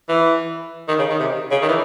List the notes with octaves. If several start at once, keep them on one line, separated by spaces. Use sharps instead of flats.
E3
D#3
C#3
D#3
C3
C#3
D#3
E3